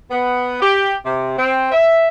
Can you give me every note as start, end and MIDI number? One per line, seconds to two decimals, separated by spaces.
0.10 0.60 59
0.61 0.92 67
1.04 1.36 48
1.37 1.71 60
1.72 2.08 76